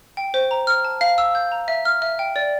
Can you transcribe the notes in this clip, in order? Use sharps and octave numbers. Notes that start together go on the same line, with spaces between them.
G5
C5
A#5
F6
A5
F5
E6
G6
A#5
E5
F6
E5
G5
D5